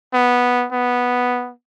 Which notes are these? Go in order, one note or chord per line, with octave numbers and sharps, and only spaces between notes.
B3
B3